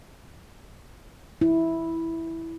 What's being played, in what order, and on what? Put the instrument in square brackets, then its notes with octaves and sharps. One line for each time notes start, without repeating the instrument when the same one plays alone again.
[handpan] E4